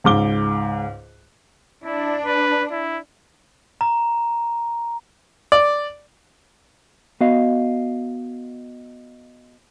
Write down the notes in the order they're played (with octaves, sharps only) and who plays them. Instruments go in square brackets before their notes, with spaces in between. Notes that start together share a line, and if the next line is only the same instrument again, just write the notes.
[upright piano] C#2 G#2 D6 G7
[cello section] D4 [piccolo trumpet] E4
[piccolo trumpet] B4
E4
[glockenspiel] A#5
[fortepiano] D5
[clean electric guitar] B3 F#4 D#5 F5